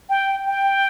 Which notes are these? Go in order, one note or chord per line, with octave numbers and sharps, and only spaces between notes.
G5
G5